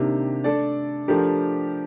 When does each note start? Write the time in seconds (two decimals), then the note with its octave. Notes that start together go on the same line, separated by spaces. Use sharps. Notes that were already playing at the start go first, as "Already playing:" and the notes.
Already playing: C3 D#3 A#3 D4 G4
0.44 A3 D4 A4 D5
1.08 F3 A3 D4 G4 A#4